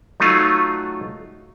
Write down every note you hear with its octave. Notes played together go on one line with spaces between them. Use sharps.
F#3 A3 D#4 F4